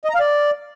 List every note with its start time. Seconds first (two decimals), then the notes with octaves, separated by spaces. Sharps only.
0.05 D#5
0.10 A#5
0.15 F5
0.20 D5